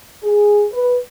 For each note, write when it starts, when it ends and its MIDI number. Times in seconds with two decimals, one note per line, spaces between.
0.23 0.65 68
0.72 0.97 71